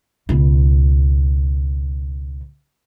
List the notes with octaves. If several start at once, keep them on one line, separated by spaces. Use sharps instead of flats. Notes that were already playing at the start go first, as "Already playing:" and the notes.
C#2 B2